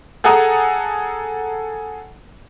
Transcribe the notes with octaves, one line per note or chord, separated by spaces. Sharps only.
G#4 A4 F#5 G#5 A#5 D#6